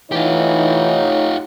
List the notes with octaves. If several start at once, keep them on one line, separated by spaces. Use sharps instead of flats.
E3 A3 D#4 F4 G4 C#5